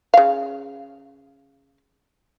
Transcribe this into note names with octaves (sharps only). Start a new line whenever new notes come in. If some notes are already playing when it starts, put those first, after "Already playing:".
C#3 F5